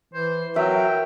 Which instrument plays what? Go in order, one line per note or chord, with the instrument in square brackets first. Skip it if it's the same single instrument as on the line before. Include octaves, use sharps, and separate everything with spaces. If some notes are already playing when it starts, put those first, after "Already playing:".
[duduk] E3 [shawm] C5
[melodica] F#3 [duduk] A#4 [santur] E5 [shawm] G5